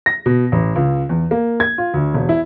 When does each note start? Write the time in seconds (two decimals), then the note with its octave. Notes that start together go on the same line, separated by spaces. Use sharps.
0.06 A#6
0.26 B2
0.52 A1
0.76 C#2
1.09 E2
1.31 A#3
1.60 G#6
1.78 F4
1.94 D2
2.14 E1
2.29 E4